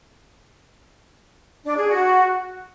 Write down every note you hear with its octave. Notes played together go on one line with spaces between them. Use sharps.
D4
G#4
F#4